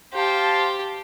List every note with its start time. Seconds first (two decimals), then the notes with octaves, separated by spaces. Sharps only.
0.14 G4 C5 F5 A5